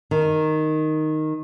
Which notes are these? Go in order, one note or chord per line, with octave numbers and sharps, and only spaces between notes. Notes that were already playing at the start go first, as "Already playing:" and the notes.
D#3